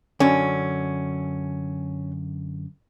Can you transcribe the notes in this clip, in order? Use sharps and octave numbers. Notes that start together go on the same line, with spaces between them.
F#2 D3 C#4